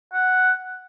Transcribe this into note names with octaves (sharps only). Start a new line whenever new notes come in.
F#5